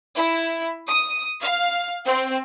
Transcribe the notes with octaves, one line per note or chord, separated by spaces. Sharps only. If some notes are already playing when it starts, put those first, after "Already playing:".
E4
D#6
F5
C4